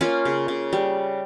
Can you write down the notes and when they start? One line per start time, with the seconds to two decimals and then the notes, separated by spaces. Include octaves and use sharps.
0.01 A#3 C#4 F4
0.25 C#3
0.48 C#3
0.73 G3